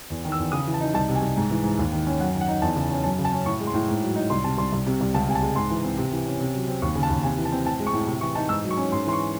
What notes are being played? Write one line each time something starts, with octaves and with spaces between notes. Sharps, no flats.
E2
D#3
E6
E2
C#3 D#6
E3
A5
D#4
C2 A5
C3
G#5
C2
G#2
E3
G#2
D#2
D#3
C#4
F#2 F#5
D#3
F#5
D#4
E2 A5
C#3
C#4
F#2 A5
C#3
A5
C#4
A2 C#6
G#3
C6
A2
G#2
F#3
D#4
C2 C6
C3 A5
C2 C6
C2
C3
C2
C#2 A5
C3 G#5
A5
G#3
G#2 C6
E3
C4
C3
E3
C#4
C3
F#3
C4
D#2 C#6
C#3
A5
D#2
C3 G#5
E3
A5
C4
A2 A5
G#3
C#6
A2
C3
E3 C#6
D#4 A5
G#2 E6
F#3
C#6
C#4
G#2 C6
E3 C6
C#6